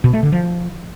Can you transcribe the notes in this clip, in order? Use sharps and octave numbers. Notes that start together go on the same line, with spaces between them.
B2
A3
D3
F3